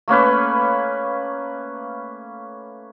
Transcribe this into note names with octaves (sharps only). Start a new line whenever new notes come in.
A3 A#3 C#4 B4